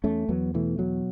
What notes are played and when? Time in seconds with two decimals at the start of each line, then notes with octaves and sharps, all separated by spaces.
0.04 E2 A3 C#4
0.29 E2 F#3 B3
0.54 B2 E3 A3
0.79 E2 F#3